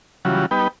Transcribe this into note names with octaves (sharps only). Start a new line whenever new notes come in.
C#3 E3 F#3 G3 F4 F#4
G3 B3 D#4 B4 G5